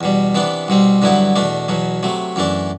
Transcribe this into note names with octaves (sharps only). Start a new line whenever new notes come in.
E2 B2 G3
C3 E3 B3 D4
C2 B2 G3 C4
G2 D3 F#3 B3 E4
E2 B2 A3 D4
E2 B2 F#3
C3 F#3 A3
F#2 E3 A3 D4